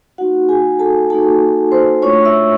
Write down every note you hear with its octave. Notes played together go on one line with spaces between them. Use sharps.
A#3 D#4 F#4 F#5
G#4 G#5
A4 A5
A#3 D#4 F#4 A4 A5
C5 C6
A3 D4 F4 C#5 C#6
E5 E6